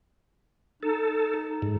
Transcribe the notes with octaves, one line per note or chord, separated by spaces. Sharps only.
D#4 A4
G#2